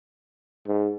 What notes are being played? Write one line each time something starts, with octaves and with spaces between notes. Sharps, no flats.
G#2